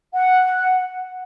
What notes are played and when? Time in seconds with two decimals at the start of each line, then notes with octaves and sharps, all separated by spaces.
0.13 F#5